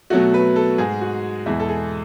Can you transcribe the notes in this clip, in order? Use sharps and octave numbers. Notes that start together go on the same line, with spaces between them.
B2 F#3 A3 F#4
B4
A4
G#2 G#3 G#4
F#4
E2 B2 G#3 E4
A4
G#4